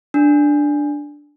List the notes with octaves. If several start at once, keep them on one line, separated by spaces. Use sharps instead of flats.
D4